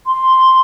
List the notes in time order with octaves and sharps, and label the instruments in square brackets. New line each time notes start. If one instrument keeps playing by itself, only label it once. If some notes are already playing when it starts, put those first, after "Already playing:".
[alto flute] C6